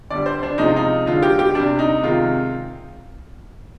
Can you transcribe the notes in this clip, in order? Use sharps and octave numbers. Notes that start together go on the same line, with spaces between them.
D3 G3 D5
C5
D4
C3 F3 G#3 D#4
F4
D#4
D3 G#3 F4
G4
G4
C3 G3 D4
D#4
C3 D#3 G#3 F4